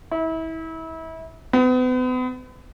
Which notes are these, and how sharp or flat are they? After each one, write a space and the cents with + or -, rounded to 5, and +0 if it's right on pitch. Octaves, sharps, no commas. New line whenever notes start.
E4 -30
B3 +40